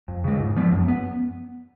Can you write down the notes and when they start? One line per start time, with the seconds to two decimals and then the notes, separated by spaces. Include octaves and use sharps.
0.08 F2
0.24 C#3 G#3
0.40 G#2
0.56 F3 B3
0.73 F#2
0.88 B3